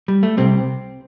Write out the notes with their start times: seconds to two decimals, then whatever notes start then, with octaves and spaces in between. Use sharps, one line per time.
0.08 G3
0.23 A3
0.37 C2 C3 G3 C4